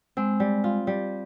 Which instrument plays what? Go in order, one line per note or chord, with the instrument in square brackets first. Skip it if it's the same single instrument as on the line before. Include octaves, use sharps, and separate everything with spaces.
[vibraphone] G#3 [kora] C4
[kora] G3
F4
G3